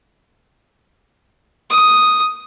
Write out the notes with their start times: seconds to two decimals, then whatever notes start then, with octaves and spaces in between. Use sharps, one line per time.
1.70 D#6